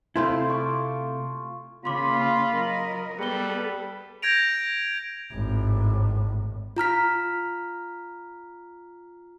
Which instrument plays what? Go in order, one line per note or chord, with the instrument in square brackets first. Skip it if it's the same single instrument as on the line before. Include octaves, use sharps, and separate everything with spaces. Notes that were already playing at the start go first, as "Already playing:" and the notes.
[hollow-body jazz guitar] C3 A3 E4 [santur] F4 C5 A5
[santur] C#6 D6
[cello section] C#3 A#3 C#4 [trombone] F4 [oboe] B5 [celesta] C6 D6
[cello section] F#3 A#4 D#5
[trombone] G3 [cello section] B3 A4 [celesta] G#4 G7 [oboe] B4
[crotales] G6 G#6 A#6 D7 F7
[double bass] G#1 A2
[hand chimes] F4 A#5 F6 B6